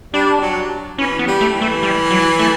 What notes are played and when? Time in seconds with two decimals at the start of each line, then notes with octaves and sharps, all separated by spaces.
0.14 G3 D4
0.42 F#3
0.98 E3 C#4
1.19 B3
1.27 G3
1.41 A3
1.54 E3
1.61 A3
1.83 G3
2.11 F#3
2.39 A3